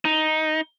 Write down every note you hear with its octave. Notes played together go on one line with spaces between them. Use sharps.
D#4